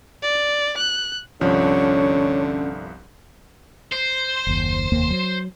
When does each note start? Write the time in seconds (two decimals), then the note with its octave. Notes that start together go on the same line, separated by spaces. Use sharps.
0.23 D5
0.77 F#6
1.41 G1 C2 D3 F3 C#4 C#5
3.92 C5
4.47 F#1 D#2
4.92 F1 D#2 A#3
5.10 F#3